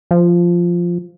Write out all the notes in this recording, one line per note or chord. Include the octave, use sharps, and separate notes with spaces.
F3